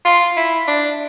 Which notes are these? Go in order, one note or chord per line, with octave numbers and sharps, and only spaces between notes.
F4
E4
D4